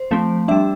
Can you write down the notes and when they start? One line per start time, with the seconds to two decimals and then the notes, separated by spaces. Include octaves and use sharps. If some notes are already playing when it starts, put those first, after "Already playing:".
Already playing: C5
0.11 F3 A3 C4
0.48 G3 D4 E5